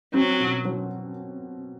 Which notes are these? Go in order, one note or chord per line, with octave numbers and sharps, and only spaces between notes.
F#3 C4
B2
F#3